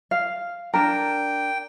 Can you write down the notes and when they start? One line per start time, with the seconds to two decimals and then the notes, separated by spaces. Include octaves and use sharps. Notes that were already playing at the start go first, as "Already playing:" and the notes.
0.11 F5
0.74 D4 A#4 G5